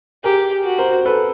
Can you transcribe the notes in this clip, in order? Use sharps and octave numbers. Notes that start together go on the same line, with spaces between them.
G4 G#4 A#4
F#4
A#4 C5
A4 B4